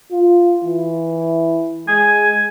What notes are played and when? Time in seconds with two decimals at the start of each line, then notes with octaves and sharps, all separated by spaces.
0.11 F4
0.64 E3
1.88 G#3 G#5